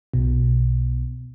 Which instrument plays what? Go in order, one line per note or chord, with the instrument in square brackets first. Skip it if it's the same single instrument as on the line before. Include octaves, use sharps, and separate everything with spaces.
[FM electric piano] B1 B2